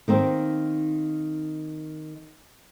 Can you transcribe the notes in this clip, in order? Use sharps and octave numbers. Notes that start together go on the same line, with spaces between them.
D#3 A#3 C4